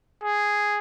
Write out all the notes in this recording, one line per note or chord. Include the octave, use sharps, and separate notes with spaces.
G#4